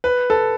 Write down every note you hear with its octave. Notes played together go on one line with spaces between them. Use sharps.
B4
A4